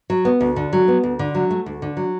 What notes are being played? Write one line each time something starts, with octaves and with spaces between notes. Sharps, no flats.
F#3
B3
D2
D3
F#3
B3
D2
D3
F#3
A3
D2
D3
F#3